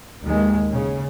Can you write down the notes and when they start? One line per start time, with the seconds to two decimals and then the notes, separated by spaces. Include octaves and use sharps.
0.24 D#2 D#3 G#3
0.72 C#3